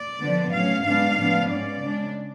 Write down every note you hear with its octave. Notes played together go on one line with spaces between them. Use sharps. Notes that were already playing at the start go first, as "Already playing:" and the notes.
Already playing: D5
D3 F3 B3 D4
A2 F#3 C#4 F5
G#2 G#3 B3 D4 F5
A2 F3 B3 D4
G#2 G#3 C#4 D5
C#3 G#3 D4